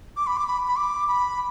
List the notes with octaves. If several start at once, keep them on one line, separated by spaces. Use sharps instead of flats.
D6
B5
D6
B5
B5
D6
B5